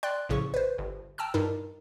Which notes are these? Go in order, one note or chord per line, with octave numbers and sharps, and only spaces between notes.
D5 G5 C6 F#6
A#1 A2 C#3 C#6
B4 C5
G1
G5 A5 A#5 E6 F6
G2 D#4 A#4